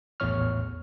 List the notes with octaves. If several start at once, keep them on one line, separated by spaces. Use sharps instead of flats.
A#1 E2 A2 C#5 C#6 F6